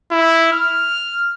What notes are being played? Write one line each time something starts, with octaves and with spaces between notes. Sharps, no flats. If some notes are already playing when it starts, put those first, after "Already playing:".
E4
F6